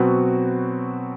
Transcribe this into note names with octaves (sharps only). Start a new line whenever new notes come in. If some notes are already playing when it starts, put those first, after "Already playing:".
Already playing: B2 F#3 C4 F#4 B4